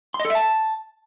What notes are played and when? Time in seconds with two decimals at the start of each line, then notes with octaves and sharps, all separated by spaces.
0.14 C6
0.20 D#5
0.25 A4
0.30 E5
0.35 A5